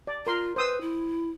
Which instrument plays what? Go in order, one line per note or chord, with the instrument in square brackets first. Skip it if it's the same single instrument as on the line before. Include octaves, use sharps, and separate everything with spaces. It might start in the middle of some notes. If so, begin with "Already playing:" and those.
[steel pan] D5
[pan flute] F4 [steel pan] A#4 C6
[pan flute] B4 [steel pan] C5 D#6 E6
[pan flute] E4